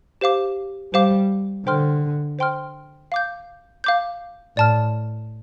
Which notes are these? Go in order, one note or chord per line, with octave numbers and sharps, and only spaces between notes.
G4 C5 F5 D6
G3 G4 C5 F5 D6
D3 C5 G5 C6 F6
C5 G5 C6 F6
F5 D6 G6
F5 D6 G6
A2 D5 A5 F6